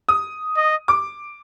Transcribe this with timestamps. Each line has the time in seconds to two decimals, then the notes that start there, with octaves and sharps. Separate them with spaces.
0.09 D#6
0.57 D#5
0.88 D6